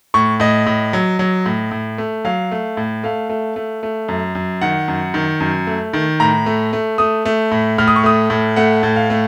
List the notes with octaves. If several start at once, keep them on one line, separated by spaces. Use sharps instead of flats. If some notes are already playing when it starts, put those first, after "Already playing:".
A2 C#6
A2 D#5
A2
F#3
F#3
A2
A2
A3
F#3 F5
A3
A2
A3 F5
A3
A3
A3
F#2
F#2
D#3 F#5
F#2
D#3
F#2
A3
D#3
A2 A#5
A3
A3
A3 D#6
A3
A2
A2 F6
D#6
C#6
A3 D#6
A2
A3 F#5
A2
F5
A3